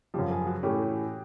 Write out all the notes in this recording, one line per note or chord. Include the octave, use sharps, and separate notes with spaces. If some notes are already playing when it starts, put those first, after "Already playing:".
F#2 C#3 F3 G4
G#4
F#4
A2 E3 A3 C#4 G4